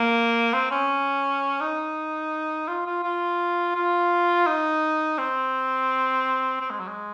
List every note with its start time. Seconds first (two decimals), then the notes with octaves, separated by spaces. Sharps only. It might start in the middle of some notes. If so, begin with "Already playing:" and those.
Already playing: A#3
0.54 C4
0.71 C#4
1.61 D#4
2.68 F4
2.87 F4
3.04 F4
3.75 F4
4.47 D#4
5.18 C4
6.61 C4
6.71 G#3
6.80 F#3
6.88 G#3